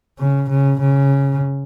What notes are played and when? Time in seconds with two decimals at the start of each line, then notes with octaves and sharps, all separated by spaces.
0.19 C#3
0.50 C#3
0.81 C#3